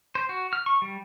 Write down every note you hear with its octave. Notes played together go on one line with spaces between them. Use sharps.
C5
F#4
F6
C#6
G3